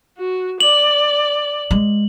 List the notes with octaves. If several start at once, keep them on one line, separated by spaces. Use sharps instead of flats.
F#4
D5 F#7
G#3